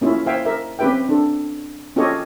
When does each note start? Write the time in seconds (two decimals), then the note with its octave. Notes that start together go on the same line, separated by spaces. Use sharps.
0.01 A#3 C#4 E4 F4 E5
0.26 C5 E5 F5 G5 G#5
0.45 A#4 E5
0.79 C4 C#4 G4 B4 E5 G5
1.09 D4 A4
1.96 C#4 F4 G4 A4 C#5 D#5